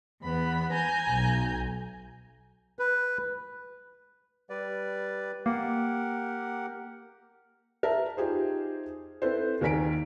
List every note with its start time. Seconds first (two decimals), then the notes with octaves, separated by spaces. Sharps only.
0.21 E2 B3 B5
0.71 G#5 A#5 G6
1.10 B1
2.79 B4
4.50 G3 B4 D5
5.46 A#3 G4 A#4 F#5
7.83 A#4 E5 A5
8.17 D#4 F4 G4 G#4 C5
9.22 C4 E4 A4 B4 C5
9.61 D#2 A#3 A#4 G#5 B6 D7